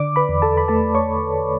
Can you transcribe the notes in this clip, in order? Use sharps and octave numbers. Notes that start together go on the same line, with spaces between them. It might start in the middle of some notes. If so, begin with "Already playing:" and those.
Already playing: D3 D5 D6
B4 B5
E2
A4 A5
B5
A3 A4 A5
C#5 C#6